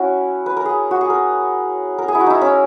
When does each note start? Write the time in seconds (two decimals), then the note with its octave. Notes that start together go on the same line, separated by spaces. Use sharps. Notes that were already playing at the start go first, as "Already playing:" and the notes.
Already playing: C#4 E4 F#4
0.46 B4
0.57 A#4
0.65 G#4
0.91 F#4
1.01 G#4
1.10 A#4
1.98 A#4
2.08 G#4
2.15 E4
2.20 F#4
2.27 D#4 E4
2.41 C#4